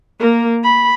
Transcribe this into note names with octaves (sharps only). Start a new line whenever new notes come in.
A#3 A#4
B5